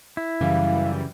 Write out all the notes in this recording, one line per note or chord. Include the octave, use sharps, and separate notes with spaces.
E4
F#2 C#3 E3 G3 F5